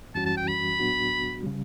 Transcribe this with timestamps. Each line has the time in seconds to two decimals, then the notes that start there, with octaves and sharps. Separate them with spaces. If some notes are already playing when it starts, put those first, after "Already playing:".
0.15 F#2 E3 G3 C#4 F#4 A5
0.26 A5
0.37 G5
0.48 B5
0.80 A2 F#3 B3 D4 F#4
1.43 C#3 G3